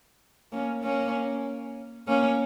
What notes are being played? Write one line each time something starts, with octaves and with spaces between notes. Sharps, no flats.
A#3 C#4
A#3 C#4
A#3 C#4